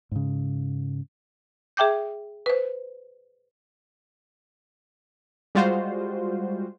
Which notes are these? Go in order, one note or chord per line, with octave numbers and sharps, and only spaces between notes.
G#2 C#3
G#4 E5 G5 D6 G6
B4 C5
G3 G#3 F4 F#4 C5